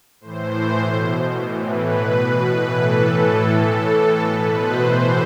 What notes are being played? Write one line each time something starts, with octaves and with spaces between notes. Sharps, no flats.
A2 E3 C5
B2
A2 E3
B4
B2
B4
A2 E3
A4
A2 E3
A2 E3 A4
A4
B2 B4
C5
A2 E3